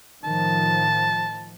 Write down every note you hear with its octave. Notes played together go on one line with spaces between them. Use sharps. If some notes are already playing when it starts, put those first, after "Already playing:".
A2 D#3 F3 A5